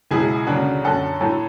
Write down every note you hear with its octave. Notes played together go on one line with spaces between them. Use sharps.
C#2 B2 F#3 E4 G#4
D2 C#3 F#3 D4 F#4
F#2 D3 F#3 F#4 A4
A2 F#3 A4 C#5